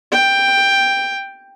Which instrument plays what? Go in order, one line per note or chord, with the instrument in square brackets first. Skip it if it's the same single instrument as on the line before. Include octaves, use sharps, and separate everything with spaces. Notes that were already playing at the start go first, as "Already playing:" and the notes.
[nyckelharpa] G5